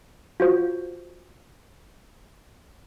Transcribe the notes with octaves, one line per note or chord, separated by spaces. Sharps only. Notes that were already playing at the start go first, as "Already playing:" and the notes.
F4 F#4 C5